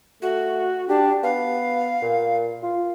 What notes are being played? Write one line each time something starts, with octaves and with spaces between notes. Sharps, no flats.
A3 F#4
D4 G4
B3 F5
A#2
F4